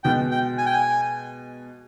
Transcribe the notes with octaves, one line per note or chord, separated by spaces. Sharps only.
B2 G#3 B3 G5
G5
G#5
G5
G#5